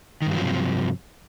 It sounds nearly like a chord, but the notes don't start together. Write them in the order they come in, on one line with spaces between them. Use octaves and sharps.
D#3 G2 F#3 F3 C3